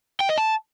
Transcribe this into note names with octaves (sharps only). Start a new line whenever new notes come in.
G5
D#5
A5